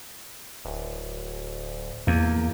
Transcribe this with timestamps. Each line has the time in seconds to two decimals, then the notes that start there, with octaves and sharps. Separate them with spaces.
0.65 D1
2.07 E2 A#3